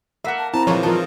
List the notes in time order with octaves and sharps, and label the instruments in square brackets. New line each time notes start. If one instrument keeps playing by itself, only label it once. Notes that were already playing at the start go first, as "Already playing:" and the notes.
[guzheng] A#3 A#4 [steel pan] E5 F#5
[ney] A5
[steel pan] C4 E4 [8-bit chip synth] A5 [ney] A#5
[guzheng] A#2 E3 G#3 [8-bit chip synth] F3 [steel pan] C#5 F5
[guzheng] E3 D#4 [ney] F4 [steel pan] A#4 A5